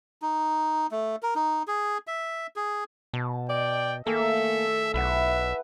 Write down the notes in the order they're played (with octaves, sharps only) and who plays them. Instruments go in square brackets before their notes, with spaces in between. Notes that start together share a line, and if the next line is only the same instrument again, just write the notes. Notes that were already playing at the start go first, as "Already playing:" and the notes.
[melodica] D#4
A3
A#4
D#4
G#4
E5
G#4
[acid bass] B2 [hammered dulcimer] A5
[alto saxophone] D5 [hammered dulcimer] D#5 [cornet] G5
[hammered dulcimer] D#3 A3 G#4 [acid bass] A#3 [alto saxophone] A4 [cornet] E5
[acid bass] B1 [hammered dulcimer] E4 B4 F#5 [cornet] E5